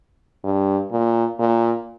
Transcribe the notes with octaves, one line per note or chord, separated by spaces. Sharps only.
G2
A#2
A#2